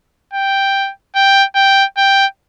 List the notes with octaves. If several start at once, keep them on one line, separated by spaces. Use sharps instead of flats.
G5
G5
G5
G5